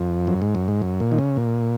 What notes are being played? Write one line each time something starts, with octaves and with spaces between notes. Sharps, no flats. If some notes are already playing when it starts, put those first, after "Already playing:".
Already playing: F2
F#2
G#2
F#2
G#2
F#2
A#2
D#3
C#3
A#2